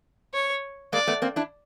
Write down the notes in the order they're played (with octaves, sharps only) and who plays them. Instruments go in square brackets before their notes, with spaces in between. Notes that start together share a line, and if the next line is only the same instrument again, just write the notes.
[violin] C#5
[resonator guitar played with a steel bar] G#3 A#3 [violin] D5
[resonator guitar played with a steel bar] A3 B3
A#3 C4
D4 E4